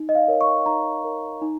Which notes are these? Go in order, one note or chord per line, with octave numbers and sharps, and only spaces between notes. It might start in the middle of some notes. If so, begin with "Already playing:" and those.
Already playing: D#4
D#5
F5
A#4 C#5
C#6
D#4 A#5
A#4 C#5
D#4